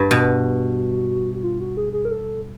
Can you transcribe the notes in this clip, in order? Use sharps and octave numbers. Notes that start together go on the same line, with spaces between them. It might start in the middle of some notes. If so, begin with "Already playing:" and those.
Already playing: G2
B2 F#4
F#4
F4
F#4
G#4
G#4
A#4
A4